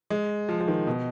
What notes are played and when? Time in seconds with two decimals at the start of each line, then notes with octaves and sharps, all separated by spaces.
0.10 G#3
0.49 F3
0.61 F3
0.68 D#3
0.87 B2